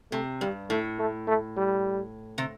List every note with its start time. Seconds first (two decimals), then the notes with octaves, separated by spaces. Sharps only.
0.12 C3 A3
0.41 G2 G3
0.70 A2 A3
0.99 A3
1.28 A3
1.57 G3
2.38 C3